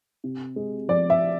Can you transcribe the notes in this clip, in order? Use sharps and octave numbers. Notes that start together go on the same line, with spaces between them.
C3
G#3
F3 D5
E5